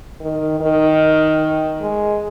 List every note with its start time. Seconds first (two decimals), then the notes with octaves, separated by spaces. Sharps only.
0.20 D#3
0.60 D#3
1.81 G#3